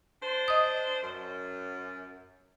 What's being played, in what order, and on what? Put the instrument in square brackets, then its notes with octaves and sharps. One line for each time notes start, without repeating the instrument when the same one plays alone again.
[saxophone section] D4 C5
[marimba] D#5 D#6
[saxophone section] F#2